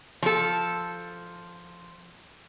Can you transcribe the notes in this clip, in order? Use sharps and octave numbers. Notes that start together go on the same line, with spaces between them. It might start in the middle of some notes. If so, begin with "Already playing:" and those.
F3 A4